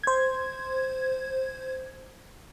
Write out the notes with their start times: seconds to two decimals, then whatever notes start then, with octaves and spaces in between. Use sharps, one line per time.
0.03 C5 G#6